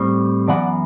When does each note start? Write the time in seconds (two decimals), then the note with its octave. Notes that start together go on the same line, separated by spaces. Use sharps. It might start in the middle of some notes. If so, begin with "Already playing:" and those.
Already playing: A2 G3 C4
0.48 F#2 E3 B3 D5 F#5